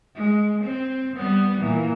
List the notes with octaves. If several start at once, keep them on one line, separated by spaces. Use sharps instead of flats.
G#3
C4
G3 B3
A#2 E3